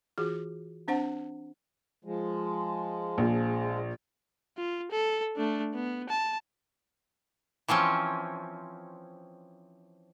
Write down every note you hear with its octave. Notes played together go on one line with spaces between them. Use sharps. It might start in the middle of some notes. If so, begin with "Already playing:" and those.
E3 F4 F#4 G#4
C4 D4 C5 F#5
F3 G#3
A#1
F4
A4
A3 D4
B3
A5
E3 F3 C4 C#4